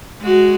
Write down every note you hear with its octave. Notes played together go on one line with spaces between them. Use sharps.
G#3 F#4